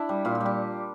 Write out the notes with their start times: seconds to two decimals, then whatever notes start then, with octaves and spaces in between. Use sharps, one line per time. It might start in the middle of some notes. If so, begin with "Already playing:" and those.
Already playing: D4 E4
0.09 G3
0.25 A#2 F4
0.35 G4
0.41 G3
0.46 G4